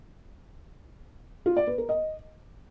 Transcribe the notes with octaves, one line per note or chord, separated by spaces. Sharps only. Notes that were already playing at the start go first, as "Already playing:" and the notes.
F4
D5
B4
A#4
D#5